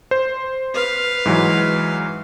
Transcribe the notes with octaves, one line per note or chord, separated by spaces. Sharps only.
C5
B4 F5
G#2 E3 F#3